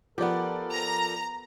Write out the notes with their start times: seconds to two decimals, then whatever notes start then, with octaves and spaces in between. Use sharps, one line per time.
0.18 F3 B3 G4 A4 A#4 D5
0.74 A#5